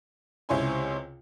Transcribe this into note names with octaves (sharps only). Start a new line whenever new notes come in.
C#2 C3 E4 C#5 G#5 C6